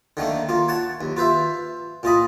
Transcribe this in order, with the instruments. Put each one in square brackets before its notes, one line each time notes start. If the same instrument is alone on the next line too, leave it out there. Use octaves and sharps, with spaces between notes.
[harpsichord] D3 D#3 A3 A#3
A#3 F4
C#5 F#5 A5
D#2
F4 B4 C5 E5
A#2 F4 D#5 B5